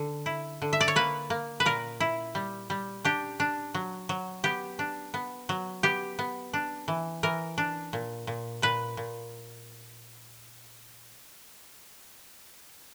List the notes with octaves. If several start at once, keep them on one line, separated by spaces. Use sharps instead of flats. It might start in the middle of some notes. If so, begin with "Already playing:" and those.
Already playing: D3
E4
D3
E5
D5
C#5
A#3 B4
A#3
B4
A#2 A#4
E4
G3
G3
D4 G4
D4
F#3
F#3
B3 G4
D4
B3
F#3
B3 G4
B3
D4
E3
E3 A#4
D4
A#2
A#2
A#2 B4
A#2